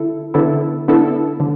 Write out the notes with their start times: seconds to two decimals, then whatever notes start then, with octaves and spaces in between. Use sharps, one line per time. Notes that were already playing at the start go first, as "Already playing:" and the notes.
Already playing: D3 E4 A4
0.34 D3 B3 E4 A4
0.88 D3 B3 E4 A4
1.40 D3